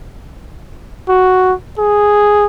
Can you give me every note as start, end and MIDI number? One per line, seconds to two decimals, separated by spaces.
1.09 1.53 66
1.79 2.46 68